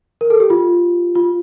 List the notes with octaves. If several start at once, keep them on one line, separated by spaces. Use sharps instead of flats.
A#4
A4
G4
F4
F4